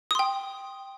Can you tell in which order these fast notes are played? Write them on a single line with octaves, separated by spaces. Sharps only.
D#6 C6 G5